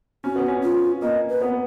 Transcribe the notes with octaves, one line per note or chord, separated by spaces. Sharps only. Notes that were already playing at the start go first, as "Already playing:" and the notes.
C#4 F#4
B3
C#4
F4
A#3 D#5
B4
B3